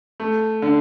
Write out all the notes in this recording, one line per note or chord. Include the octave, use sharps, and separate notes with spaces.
A3
D3